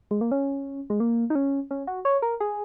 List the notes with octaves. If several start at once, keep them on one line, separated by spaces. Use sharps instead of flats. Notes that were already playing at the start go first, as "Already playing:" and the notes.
G#3
A#3
C#4
G#3
A#3
D#4
C#4
C#4
F#4
C#5
A#4
G#4